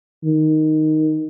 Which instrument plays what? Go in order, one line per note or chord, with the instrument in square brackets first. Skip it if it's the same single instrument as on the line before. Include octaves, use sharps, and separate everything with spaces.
[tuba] D#3